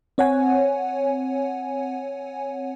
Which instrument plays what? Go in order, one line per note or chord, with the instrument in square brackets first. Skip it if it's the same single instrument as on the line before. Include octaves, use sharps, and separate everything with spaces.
[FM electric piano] C4 C#5 F#5 G#5